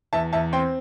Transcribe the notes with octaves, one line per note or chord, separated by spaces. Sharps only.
E2 E5 A5
E2 E5 A5
C4 G5 C6